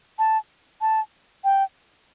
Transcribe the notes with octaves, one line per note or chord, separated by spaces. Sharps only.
A5
A5
G5